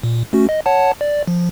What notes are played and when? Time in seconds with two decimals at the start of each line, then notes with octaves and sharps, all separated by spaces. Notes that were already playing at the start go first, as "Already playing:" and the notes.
0.03 A#2
0.33 A3 C#4 F#4
0.49 D#5
0.66 C#5 F#5 A5
1.01 D5
1.28 F3